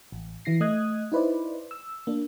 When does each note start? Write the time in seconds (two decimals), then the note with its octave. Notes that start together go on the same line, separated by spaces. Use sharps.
0.12 A1
0.45 E3 E4 A#6 C7
0.60 A3 D#5 D#6 F#6 G#6
1.12 D#4 E4 B4 C5 D5
1.71 E6
2.07 A#3 D4